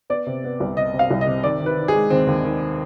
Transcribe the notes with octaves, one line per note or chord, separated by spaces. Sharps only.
B3 D5
C3
B3
C2
C3 D#5
C3
F5
C2
D#5
C3
D#3 D5
D#3
B4
D#3
G#4
G#3
D#2 C4
D#2
D#3